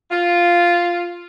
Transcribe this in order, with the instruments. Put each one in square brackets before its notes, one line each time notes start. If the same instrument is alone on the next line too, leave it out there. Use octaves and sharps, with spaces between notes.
[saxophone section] F4